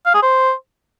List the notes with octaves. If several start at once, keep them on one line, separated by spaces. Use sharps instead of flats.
F5
G#4
C5